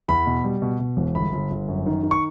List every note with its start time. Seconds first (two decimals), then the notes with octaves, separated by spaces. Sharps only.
0.08 E2 B5
0.26 B2
0.44 G3
0.62 B2
0.80 B2
0.97 E1
1.15 G1 B5
1.33 G1
1.51 G1
1.68 F#2
1.86 D#3
2.03 D#3
2.11 C#6